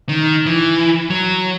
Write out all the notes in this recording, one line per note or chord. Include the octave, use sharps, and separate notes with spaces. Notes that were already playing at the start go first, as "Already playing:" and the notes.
D#3
E3
F#3